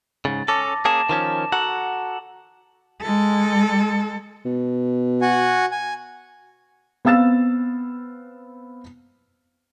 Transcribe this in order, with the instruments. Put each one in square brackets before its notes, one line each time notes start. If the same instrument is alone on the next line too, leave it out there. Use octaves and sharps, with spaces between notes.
[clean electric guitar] G#2 C#3 [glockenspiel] A6
[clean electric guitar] C#4 A4 [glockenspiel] A5 D6 A#6
[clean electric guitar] A#3 C#4 G#4 [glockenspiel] A5 E7
[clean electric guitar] D#3 F3 C#4
[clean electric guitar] F#4 A4 F#5 [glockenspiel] A#5 E7 F#7
[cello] G#3 A4
[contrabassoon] B2
[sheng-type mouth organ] F#4 F#5 G#5
G#5
[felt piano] B3 C4 F5 E6 A6 E7